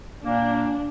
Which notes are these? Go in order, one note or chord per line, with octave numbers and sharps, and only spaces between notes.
A#2 A#3 D4